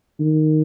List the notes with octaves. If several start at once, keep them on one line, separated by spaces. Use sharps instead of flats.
D#3